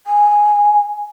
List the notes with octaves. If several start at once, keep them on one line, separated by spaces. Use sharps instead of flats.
G#5